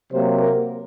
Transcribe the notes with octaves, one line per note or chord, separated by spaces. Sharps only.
C3 F#3 A#3 C5
A#4